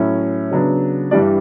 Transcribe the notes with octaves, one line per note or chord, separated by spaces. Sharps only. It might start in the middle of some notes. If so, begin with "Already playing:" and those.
Already playing: A2 F#3 C#4 E4
C#3 F#3 B3 D4
G2 E3 G3 D4 D5